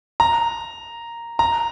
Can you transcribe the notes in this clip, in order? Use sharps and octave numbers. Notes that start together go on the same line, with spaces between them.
A#5
A#5